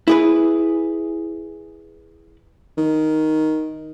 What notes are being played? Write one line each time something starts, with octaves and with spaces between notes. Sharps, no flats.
E4 G#4 B4
D#3